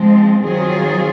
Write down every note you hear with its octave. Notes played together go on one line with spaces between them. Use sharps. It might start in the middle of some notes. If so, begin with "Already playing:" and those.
Already playing: F3 G#3 C4
D#3 F#3 C4 F4 G#4